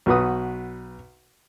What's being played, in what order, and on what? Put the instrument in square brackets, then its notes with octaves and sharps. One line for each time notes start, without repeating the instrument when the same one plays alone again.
[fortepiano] B1 F#4 B4 D#6